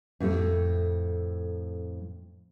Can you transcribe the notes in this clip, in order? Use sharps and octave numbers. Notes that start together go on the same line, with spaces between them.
F2 A2 A3 A4